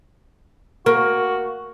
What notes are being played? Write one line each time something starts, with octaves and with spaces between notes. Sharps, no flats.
A#3 F#4